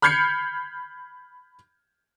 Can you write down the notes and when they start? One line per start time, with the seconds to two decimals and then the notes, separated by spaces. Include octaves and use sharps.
0.02 B5 F6 G6 G#6 C7 C#7